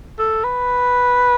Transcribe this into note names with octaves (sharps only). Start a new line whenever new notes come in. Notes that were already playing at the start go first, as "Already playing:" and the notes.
A4
B4